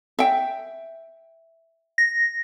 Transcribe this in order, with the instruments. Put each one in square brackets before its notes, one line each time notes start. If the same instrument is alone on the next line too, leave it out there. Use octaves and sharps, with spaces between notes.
[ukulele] E5 G5
[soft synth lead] A#6